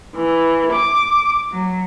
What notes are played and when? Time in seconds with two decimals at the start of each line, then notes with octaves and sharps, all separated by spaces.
0.15 E3
0.72 D6
1.51 F#3